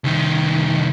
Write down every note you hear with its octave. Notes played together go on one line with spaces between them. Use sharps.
C2 D#3